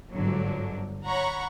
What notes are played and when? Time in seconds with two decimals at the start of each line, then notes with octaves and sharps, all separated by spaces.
0.11 G1 G#2 D3 F#3
1.07 C#5 F#5 A#5 B5 C#6